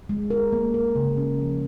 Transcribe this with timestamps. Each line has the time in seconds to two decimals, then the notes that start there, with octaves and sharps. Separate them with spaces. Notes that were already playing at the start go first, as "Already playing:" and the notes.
0.09 G#3
0.30 A#4
0.53 A#3
0.74 A#4
0.96 C#3
1.17 C#4
1.40 F3